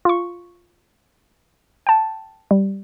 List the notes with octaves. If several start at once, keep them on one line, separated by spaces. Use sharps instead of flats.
F4 C#6
G5 A5
G3